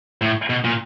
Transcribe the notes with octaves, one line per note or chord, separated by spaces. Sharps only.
A2
B2
A#2